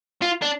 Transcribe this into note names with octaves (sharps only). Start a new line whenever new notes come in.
F4
D4